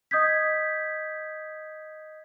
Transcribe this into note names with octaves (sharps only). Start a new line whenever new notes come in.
D#5 D#6 G6 G#6 B6